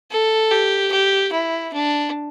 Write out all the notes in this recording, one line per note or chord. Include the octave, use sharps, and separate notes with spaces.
A4
G4
G4
E4
D4